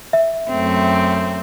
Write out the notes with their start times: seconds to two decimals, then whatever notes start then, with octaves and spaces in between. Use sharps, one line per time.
0.13 E5
0.48 F#2 A3 C4